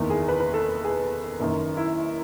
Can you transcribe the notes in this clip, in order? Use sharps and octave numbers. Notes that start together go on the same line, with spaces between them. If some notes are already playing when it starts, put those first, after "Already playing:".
Already playing: F#1 E2 D#3
G#4
B4
B4
A4
G#4
F#1 F#2 D#3
E4